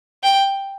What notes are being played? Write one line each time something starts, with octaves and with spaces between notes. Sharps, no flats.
G5